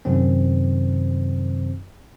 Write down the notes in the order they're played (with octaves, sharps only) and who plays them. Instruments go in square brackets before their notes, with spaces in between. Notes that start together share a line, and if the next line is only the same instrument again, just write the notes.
[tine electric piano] F#2 C3 D#3 C4